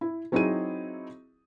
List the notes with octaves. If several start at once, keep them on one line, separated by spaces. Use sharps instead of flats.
E4
F#3 C4 D#4 E4 G#4 D#7